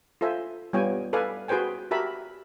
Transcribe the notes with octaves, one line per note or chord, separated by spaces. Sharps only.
F4 A4 C5 E5 G#5
G3 B3 F4 C#5 G5 G#5
A4 B4 D5 F5 G#5
F#4 G#4 B4 C5 G5 G#5
F#4 G4 A#4 E5 A5 B5